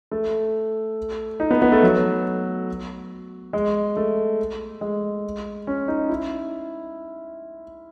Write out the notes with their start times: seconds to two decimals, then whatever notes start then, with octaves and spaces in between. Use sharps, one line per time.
0.11 A3
1.40 D#4
1.51 B3
1.62 B3
1.72 A3
1.83 F#3
3.53 G#3
3.96 A3
4.81 G#3
5.67 C#4
5.88 D#4
6.09 E4